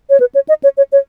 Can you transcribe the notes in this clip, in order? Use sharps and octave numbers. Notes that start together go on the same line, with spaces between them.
C#5
B4
C#5
D#5
C#5
C#5
C#5